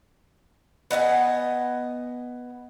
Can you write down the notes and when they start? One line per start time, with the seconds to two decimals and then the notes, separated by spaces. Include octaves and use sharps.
0.91 B3 D#5 E5 G#5